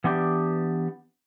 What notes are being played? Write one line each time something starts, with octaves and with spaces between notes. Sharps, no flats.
E3 B3 D4 G4